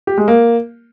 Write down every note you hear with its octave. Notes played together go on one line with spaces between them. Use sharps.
G4
G#3
A#3